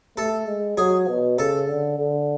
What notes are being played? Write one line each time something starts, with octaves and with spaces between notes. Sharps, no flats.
A3 A4
G#3
F#3 G#4
B2
C#3 A4
D3
D3